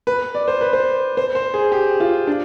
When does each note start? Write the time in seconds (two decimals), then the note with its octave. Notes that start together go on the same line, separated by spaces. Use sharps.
0.07 B4
0.35 D5
0.48 C5
0.61 B4
0.73 C5
1.17 C5
1.35 C5
1.54 G#4
1.72 G4
2.00 F4
2.27 D4